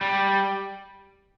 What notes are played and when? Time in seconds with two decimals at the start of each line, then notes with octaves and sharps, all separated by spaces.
0.01 G3